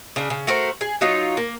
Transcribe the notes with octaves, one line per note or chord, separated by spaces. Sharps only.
C#3 D4
C#3
A3 F#4 A#4 C5
G#4
F#3 D#4 F4 C#5
A#3